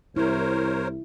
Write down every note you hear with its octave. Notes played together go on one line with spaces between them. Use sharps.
C2 E4 A#4 C5 C#5